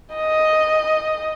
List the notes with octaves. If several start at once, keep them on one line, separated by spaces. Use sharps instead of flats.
D#5